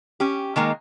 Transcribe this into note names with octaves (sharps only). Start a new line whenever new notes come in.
C#4 G4
D#3 G#3 A#3